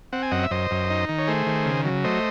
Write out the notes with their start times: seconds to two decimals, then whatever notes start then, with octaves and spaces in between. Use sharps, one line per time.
0.13 C4 F#5
0.23 G#5
0.31 F#2 D#5 F#5
0.43 E5
0.51 F#2 C5 D#5
0.71 F#2
0.90 D#4
1.09 D#3
1.19 C#5
1.27 A3 G#4 C5
1.47 D#3
1.66 C#3
1.85 F#3
2.04 A3 C5 D#5